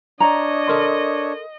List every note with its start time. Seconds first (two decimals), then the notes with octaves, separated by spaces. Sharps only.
0.20 D4 C#5 D#5 A#5
0.68 A4 A#4 C6